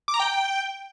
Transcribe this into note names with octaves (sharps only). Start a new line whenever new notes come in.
D6
A#5
G5